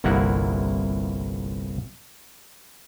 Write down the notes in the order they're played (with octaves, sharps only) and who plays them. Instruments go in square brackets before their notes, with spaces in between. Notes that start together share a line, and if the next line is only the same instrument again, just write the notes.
[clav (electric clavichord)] G1 C2 A#3 E4 F#5